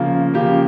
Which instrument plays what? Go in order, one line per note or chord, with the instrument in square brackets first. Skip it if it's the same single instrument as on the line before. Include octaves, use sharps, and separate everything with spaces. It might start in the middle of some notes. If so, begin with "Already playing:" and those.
Already playing: [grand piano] C#3 F3 A#3
C#3 F3 A#3 G4